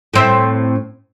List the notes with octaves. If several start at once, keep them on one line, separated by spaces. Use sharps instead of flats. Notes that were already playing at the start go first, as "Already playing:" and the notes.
A2 C4 E5